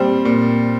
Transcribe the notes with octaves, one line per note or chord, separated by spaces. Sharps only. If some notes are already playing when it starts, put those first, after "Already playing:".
Already playing: A#2 G3 C4
A#2